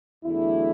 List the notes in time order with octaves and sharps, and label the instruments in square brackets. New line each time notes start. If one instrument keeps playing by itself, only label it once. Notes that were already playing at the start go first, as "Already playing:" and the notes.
[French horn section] E2 D3 F#3 A3 D4 E4